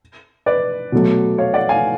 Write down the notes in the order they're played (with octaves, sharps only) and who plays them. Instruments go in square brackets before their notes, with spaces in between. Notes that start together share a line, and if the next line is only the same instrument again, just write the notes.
[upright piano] B4 D5
[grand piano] B2 F#3 A3
[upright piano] C#5 F5
D5 F#5
F5 G#5